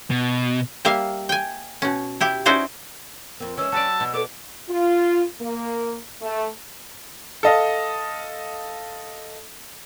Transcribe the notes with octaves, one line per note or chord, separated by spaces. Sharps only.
B2
G3 A#3 E5 F5
G5 G#5
B2 C#4
E4 G4
C#4 D#4 E4 F#4 C5 D5
F2 C4 A#4
D#3 E3 G#3 C#4 E6
F#3 F#4 B4 D5 A5
B2
A4 B4 C#5 D6
F4
A#3
A3
A4 D#5 F5